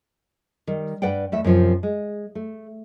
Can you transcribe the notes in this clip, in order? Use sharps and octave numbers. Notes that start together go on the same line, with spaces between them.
D#3 G3
G2 B4 D5 F#5 G5
E2 A3 E5
F#2 C3 F3
G#3
A3